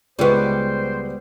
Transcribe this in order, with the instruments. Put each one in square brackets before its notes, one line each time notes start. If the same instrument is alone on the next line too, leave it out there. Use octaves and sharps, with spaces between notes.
[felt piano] C#2 G#3 C#6 [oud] G3 B3 [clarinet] C5